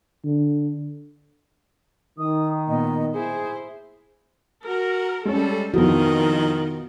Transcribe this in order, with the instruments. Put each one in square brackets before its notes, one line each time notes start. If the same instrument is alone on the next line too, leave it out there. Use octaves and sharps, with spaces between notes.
[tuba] D3
[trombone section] D#3 [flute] D#6
[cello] A#2 B3 [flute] D#5
[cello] E4 C5 [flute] G#4
[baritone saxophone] F#4 [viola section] A#4
[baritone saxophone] G3 [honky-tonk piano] G#3 C#4 [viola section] A4
[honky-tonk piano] F2 E3 [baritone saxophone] D#3 [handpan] B3 F#4 [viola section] F4 A#4 D#5